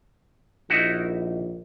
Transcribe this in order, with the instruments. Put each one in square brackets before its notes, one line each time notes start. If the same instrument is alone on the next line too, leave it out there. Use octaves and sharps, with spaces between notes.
[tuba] A#1 [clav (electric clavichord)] D#4 E4 F#4